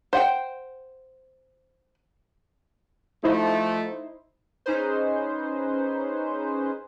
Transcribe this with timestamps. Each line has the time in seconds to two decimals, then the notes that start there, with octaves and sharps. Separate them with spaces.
0.13 C5 F#5 G5
3.24 F3 A3 D#4 E4 C5
4.66 C#4 D#4 G#4 B4 C5